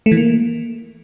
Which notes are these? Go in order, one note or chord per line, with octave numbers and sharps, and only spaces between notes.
A3
E3
A#3